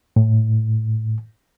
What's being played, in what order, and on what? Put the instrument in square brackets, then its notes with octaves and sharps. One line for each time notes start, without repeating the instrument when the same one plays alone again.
[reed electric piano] A2